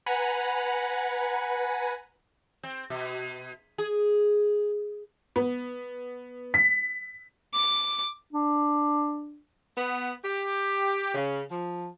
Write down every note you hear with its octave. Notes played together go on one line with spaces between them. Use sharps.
B4 F#5 G#5 A#5 B5
C4
B2
G#4
B3
B6
D6
D4
B3
G4
C#3
F3